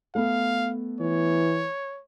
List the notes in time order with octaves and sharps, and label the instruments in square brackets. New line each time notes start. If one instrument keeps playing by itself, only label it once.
[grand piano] A3 B3 [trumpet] F5
[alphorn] E3 [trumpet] C#5